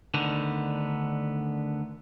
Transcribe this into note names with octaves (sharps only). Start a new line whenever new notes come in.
D2 D3 D#3 B3